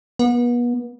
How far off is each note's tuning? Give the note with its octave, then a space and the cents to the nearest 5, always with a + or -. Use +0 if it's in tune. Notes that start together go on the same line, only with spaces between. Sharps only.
B3 -35